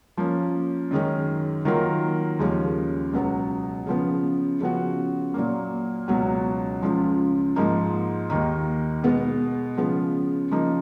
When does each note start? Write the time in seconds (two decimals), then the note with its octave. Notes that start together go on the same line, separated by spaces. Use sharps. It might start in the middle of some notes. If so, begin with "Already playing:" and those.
0.17 F3 A#3 C#4
0.91 F#2 D#3 G#3 C#4
1.65 D#3 F#3 A#3 F4 A#4
2.39 D#2 C#3 F3 G#3 C#4
3.13 C#2 B2 F#3 B3
3.87 C#3 F3 B3
4.61 C#3 F3 B3 F#4
5.34 A#2 F#3 A#3
6.08 C#2 B2 F#3 C#4 F#4
6.82 C#2 C#3 F3
7.56 G#2 F3 A#3 D#4
8.30 D#2 D#3 A#3 D#4
9.04 B2 G#3 B3
9.77 C#3 F3 G#3 B3
10.51 C#3 F3 A#3 D#4